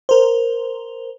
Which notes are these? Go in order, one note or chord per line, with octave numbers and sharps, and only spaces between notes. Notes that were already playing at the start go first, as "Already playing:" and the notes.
A#4 C5